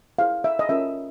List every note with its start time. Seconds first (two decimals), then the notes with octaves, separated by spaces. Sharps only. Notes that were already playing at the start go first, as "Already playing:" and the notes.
0.19 E4 G#4 C5 F5
0.44 E5
0.59 D#5
0.69 C#4 F4 A#4 C#5 E5